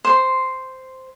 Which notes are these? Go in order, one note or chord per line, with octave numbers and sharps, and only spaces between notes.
C5 C6